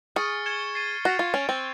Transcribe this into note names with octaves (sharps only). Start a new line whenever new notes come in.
G#4 C#6 F6 A6 C#7
G#6 C#7 E7 G7
A6 C7 D#7 G7
F#4 A6 C7 F7
F4
C#4 A6 D7 F7
C4